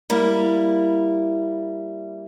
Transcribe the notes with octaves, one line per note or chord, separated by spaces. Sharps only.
G3 A#3 E4